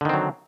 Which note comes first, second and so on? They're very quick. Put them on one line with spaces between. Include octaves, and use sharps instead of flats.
D3 D#3 C4 F#3